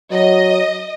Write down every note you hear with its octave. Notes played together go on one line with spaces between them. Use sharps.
F#3 D#5